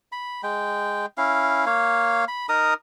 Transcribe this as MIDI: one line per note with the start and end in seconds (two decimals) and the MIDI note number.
0.12 0.41 83
0.43 1.06 56
0.43 1.06 79
1.18 1.65 61
1.18 1.65 64
1.18 1.65 77
1.66 2.25 58
1.66 2.25 73
1.66 2.25 77
2.28 2.46 83
2.49 2.74 63
2.49 2.74 70
2.49 2.74 82
2.49 2.74 87